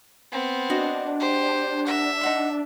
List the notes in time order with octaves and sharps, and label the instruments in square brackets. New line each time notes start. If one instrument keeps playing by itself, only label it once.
[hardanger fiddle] B3 C4
[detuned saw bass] D4 [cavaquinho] F#4 D#5
[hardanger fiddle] G4 C5
[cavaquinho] A#4 F#5 [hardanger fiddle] E5
[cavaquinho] D#4 F#5 C6